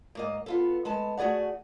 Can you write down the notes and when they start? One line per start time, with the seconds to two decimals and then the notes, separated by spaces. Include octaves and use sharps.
0.15 G#2 A#3 D#5
0.46 B3 F4 A4
0.85 G#3 B3 A5
1.18 A3 F#4 G#4 D5 F#5